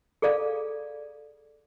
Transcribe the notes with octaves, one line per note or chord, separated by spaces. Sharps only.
G#4 A4 D5 F5